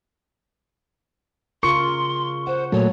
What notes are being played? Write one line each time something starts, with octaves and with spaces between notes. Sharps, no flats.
C#3 F4 A#4 C6 C#6 C#7
C5 F#5
A#2 F#3 A3 C#5